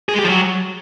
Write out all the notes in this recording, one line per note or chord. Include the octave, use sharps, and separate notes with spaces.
G#4
G#3
G4
F3
F#3